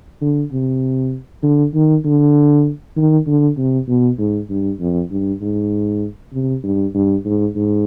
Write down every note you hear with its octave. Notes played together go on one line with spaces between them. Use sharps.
D3
C3
D3
D#3
D3
D#3
D3
C3
B2
G#2
G2
F2
G2
G#2
C3
G2
G2
G#2
G#2